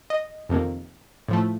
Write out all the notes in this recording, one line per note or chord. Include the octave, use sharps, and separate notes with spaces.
D#5
F2 C3 D#3 A#3
A2 F3 A3